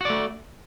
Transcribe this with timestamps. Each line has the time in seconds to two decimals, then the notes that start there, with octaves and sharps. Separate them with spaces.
0.01 F#4
0.05 D5
0.10 A3